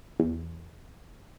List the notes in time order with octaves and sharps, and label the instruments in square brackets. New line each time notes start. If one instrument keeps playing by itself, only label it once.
[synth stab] E2